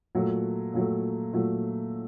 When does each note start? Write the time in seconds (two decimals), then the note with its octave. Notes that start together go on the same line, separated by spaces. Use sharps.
0.15 A#2 F#3 A3
0.74 A#2 F#3 A3
1.33 A#2 F#3 A3